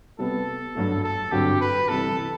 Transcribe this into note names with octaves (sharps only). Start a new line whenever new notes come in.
C3 G3 B3 A4
G2 F#3 A3
A4
G2 D3 F#3 C4 F#4 G4
B4
C3 E3 G3 A4